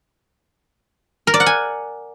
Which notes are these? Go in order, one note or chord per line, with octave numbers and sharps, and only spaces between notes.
A#4
D5
F#5
G#5